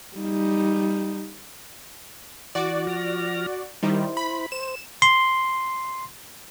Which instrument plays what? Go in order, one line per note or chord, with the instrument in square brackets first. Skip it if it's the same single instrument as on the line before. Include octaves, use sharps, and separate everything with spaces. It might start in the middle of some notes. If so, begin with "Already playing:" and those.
[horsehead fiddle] G3 D#4
[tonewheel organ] E3 [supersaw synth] F#4 D5
[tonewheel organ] F3 F6 A#6
[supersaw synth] D#3 G3 [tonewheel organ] E4 C5
[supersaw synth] B5
[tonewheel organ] C5 [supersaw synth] E7
[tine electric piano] C6